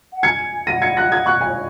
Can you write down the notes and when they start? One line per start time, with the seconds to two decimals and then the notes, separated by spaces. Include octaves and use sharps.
0.13 F#5
0.23 G#5 A#5 G#6 C#7
0.67 F#5 A#6 D#7
0.82 G#6 C#7
0.97 F#6 A#6
1.12 D#6 G#6
1.26 C#6 F#6
1.41 G#5
1.48 C#5